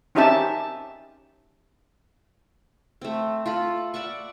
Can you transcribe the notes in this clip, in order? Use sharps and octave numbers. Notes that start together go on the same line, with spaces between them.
C4 C#4 D#4 G4 E5 A5
A3 C4
F4 A4 B5
D5 E5 F#5 C#6